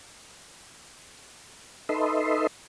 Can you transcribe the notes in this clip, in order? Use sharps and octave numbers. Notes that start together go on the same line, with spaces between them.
D#4 A4 B4 D#5 E5 C6